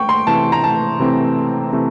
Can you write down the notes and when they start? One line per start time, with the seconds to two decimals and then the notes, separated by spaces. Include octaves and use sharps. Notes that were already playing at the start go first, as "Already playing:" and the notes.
Already playing: G5 C#6
0.09 C6
0.27 C3 E3 A3 C4 A5
0.52 A#5
0.64 A5
0.99 C3 E3 A3 C4
1.73 C3 E3 A3 C4